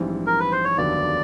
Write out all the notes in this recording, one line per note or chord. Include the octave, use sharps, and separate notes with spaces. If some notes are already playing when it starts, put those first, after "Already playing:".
Already playing: A#1 G#2 E3 G3 C4
A#4
B4
C5
C#5
F1 D#2 D3 F#3 B3 D5